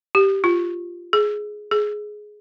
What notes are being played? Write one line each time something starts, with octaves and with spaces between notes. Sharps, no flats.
G4
F4
G#4
G#4